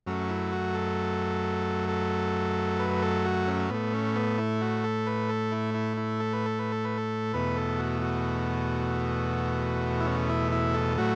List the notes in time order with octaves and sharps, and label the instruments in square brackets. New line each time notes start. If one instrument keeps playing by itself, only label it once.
[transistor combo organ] F#2 F#3 A3 C#4
E4
F#4
A4
A4
B4
A4
F#4
C#4
A2 A3 B3
C#4
B3
E4
F#4
A4
B4
A4
E4
E4
E4
A4
B4
A4
B4
A4
B4
A4
E2 B2 A3 B4
A4
F#4
F#4
E4
C#4
E4
E4
A4
A2 F#3 A3 F#4